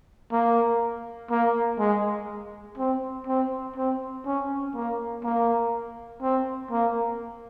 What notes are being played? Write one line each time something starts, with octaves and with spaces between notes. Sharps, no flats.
A#3
A#3
G#3
C4
C4
C4
C#4
A#3
A#3
C4
A#3